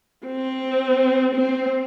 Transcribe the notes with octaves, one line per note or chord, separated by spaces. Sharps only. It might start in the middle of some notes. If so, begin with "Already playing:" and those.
C4
C4